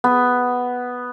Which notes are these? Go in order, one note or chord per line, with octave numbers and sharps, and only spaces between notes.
B3